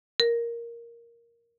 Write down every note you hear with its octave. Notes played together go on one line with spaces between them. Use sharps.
A#4